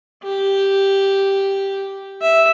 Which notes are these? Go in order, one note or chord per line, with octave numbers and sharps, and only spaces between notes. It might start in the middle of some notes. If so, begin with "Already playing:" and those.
G4
E5